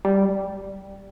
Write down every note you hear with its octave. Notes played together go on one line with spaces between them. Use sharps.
G3